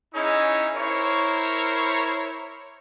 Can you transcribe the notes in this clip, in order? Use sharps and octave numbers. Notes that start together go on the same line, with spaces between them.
C#4 D#4 E4 G#4 C#5 D#5
E4 A#4 C5 C#5